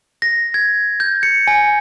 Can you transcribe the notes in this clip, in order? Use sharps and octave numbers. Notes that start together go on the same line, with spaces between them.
A#6
G#6
G6
C#7
G#5